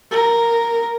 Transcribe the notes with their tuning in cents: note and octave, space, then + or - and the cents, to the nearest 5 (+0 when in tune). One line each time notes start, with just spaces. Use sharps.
A#4 -5